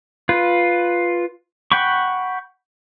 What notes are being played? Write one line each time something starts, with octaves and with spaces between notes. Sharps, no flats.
F4 B4
F#5 G5 B5 C#6